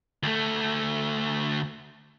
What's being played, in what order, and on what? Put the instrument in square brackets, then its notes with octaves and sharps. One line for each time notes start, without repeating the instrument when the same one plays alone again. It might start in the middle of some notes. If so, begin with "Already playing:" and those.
[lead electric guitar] D2 A3